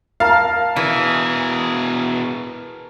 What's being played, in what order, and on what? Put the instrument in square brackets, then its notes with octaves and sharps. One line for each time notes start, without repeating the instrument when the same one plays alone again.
[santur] A#4 A5 [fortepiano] F5
[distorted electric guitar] B2 G#4 [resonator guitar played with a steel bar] E3